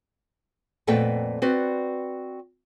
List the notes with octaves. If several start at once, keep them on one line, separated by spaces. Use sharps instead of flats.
F2 A#2 A3 B3 A4 G5
C4 F#4 B4 D5